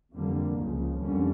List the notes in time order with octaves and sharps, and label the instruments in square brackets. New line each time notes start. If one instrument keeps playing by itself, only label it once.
[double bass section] F2 D3 G3 A#3
C#2 C#3 F3
F2 D3 G3 A#3 C#4